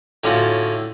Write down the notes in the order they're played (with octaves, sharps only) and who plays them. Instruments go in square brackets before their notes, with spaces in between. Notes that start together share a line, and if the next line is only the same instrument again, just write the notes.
[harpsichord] A2 D3 C#4 F4 F#4